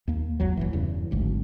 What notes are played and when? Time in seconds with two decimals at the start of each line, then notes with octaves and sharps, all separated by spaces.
0.08 D#2 A#3
0.40 G1 D#2 F#3
0.57 D1 G2 E3
0.73 E2 G2 C#3
1.11 D1 G#1 D2